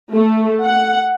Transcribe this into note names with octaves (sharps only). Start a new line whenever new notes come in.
A3
F#5